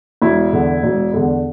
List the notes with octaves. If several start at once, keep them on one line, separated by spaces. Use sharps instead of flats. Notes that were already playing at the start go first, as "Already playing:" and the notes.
E1 E4
E2 D3
E1
E2 D3